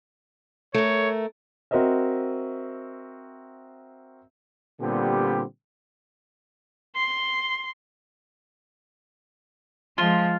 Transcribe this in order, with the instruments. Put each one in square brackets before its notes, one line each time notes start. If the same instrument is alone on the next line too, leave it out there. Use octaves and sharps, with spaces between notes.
[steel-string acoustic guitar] A3 A#4 [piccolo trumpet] C#5
[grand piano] C4 F#4 A#4 C5 D#5 E5
[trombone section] A#2 D3 G3 B3 C4 G4
[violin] C6
[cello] F3 G#3 [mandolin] F4